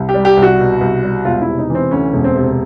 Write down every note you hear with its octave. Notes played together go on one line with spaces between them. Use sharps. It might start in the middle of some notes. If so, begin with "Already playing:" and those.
Already playing: C2
G4
G3
G4
C2
F#4
B2
C2
G3
E1 F4
E4
C3
D#4
E3 C4
D2 C#4
E1
C4
C3